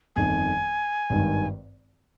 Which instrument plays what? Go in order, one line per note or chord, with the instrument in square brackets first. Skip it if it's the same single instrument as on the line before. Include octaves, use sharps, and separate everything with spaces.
[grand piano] G1 F2 D#3 [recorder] G#5
[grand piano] G#1 G2 D#3